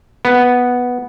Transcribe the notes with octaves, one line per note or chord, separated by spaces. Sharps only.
B3